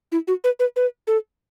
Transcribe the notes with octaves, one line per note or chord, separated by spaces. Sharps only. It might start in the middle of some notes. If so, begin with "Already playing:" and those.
E4
F#4
B4
B4
B4
A4